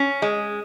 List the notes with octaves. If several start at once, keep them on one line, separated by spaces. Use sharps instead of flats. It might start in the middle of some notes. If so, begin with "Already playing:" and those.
Already playing: C#4
G#3